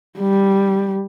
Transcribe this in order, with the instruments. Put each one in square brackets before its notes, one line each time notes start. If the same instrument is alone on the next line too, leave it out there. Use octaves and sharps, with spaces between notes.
[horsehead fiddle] G3